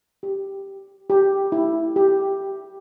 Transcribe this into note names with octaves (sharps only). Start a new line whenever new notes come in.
G4
G4
E4
G4